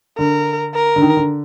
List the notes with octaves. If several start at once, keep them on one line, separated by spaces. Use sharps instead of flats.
D3 A#4
A#4
D3
D#3
D3